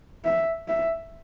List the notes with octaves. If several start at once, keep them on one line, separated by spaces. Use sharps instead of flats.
E5
E5